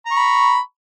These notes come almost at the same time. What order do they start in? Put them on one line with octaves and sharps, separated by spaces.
A#5 C#6 B5